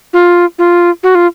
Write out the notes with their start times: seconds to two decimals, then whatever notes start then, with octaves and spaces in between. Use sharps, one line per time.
0.13 F4
0.58 F4
1.03 F#4
1.15 F4